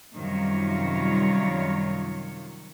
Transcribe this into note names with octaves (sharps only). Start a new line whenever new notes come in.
F#2 C3 D#3 G3 F4 C#5